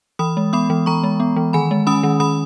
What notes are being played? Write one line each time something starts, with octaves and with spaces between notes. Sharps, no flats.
E3 B5 D#6
G#3
B3 B5 D#6
E3
E3 A#5 C#6
G#3
B3
E3
D#3 G#5 B5
G#3
C#4 B5 D#6
D#3
D#3 B5 D#6